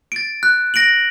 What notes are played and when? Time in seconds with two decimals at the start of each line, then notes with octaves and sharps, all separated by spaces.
0.12 A6 D7
0.43 F#6
0.74 A#6 D7 F#7